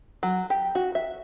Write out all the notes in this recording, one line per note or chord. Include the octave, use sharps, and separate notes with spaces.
F#3
G4
F#4
E5